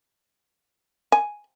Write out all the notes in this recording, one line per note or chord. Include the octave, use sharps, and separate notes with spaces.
G#5